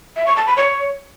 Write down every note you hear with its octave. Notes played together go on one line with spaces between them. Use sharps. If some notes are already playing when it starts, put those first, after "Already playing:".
E5
C#6
A5
B5
C#5